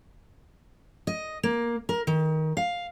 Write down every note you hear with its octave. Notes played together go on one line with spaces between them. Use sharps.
D#5
A#3
A#4
D#3
F5